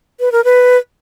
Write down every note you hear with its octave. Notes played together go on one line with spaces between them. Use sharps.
B4
A#4
B4